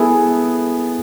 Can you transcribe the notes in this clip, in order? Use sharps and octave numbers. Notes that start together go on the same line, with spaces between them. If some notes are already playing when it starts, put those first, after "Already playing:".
Already playing: B3 E4 G#4 A4